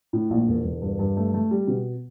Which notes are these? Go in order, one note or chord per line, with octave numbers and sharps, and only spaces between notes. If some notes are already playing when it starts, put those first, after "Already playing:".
A2
A#1
E1
E1
G2
G2
A3
A3
G3
B2